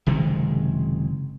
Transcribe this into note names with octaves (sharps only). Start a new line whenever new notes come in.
F#1 C3 D#3 G#3